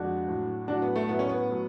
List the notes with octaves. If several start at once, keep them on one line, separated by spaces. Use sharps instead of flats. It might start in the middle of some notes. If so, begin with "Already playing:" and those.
Already playing: F2 D3 G#3 D4 F#4
A2 F#3
A2 F#3 D4 F#4
B3
A3
A2 F#3 B3
C#4
B3
A2 F#3